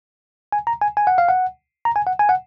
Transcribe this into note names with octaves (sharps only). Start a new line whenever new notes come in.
G#5
A#5
G#5
G#5
F#5
F5
F#5
A#5
G#5
F#5
G#5
F#5